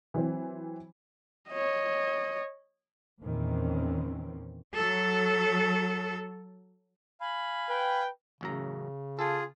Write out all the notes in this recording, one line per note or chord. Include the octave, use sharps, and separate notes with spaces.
E3 F#3 C4
C#5 D#5
E2 A#2 D#3 E3 C4 C#4
F#3 A4
F5 G#5 B5
B4 G5
A1 F#2 C#3 A#5
F4 G#4 A4 A5